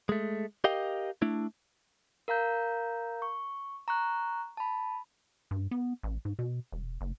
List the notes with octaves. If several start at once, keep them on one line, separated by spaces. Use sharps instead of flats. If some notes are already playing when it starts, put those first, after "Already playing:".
G#3 A3
G4 A#4 D#5 F5 G5
A3 D4 E4
A#4 F5 A#5 G6
C#6
A#5 C#6 F#6
A5 B5
G2
B3
A1
G#2
B2
E1
F#1